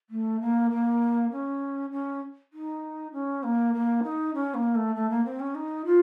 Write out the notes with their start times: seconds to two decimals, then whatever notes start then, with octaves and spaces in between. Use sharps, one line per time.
0.10 A3
0.41 A#3
0.71 A#3
1.31 C#4
1.92 C#4
2.53 D#4
3.13 C#4
3.43 A#3
3.74 A#3
4.03 D#4
4.34 C#4
4.54 A#3
4.75 A3
4.95 A3
5.10 A#3
5.25 C4
5.39 C#4
5.55 D#4
5.85 F4